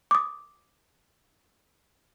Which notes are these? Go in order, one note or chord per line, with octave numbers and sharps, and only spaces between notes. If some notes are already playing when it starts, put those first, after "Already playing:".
D6 D#6